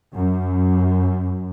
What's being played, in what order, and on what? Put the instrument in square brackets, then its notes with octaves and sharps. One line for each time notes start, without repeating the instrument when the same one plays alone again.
[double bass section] F#2